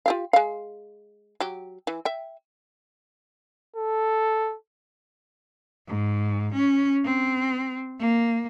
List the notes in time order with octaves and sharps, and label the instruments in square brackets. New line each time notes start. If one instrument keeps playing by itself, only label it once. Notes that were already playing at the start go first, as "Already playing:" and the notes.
[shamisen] F4 G4 F5
G#3 F5
F#3 G4
E3
E5 G5
[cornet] A4
[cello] G#2
C#4
C4
A#3